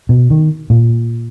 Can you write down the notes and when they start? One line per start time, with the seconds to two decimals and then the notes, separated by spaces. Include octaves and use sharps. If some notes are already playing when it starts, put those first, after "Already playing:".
0.09 B2
0.30 D#3
0.70 A#2